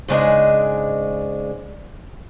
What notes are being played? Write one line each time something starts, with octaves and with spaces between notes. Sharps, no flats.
G#2 C#3 G#3 D4 D#5